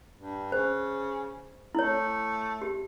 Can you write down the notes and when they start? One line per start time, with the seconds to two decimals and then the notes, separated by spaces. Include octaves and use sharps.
0.16 G2
0.52 C#3 C5
1.75 A3 E4 C#5
2.62 G4